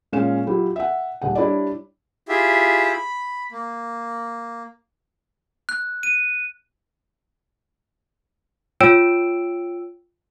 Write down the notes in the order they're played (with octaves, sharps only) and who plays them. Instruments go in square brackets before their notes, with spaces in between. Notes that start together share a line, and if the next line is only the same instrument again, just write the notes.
[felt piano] A#2 G#3 C#4 C#5 F5 E7
F#3 E4 F4 G4
E5 F#5
D#1 F#5
G3 D4 E4 C#5 D5
[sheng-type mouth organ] E4 F4 G4 G#4 E5
B5
A#3
[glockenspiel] F#6
D#7
[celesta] F4 C#5 G5 E6 D7 E7